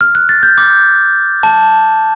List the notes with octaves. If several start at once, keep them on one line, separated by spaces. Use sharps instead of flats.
F6
F#6
A6
G6
D6
A5